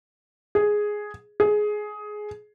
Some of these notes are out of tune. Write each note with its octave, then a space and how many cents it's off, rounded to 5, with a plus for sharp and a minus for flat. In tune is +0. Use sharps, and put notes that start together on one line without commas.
G#4 +5
G#4 +15